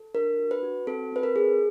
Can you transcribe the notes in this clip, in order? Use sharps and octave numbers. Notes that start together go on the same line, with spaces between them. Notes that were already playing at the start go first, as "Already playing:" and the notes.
Already playing: A4
D4 A#4
F#4
B4
F#4
C4 A4
C4 B4
A#4
G#4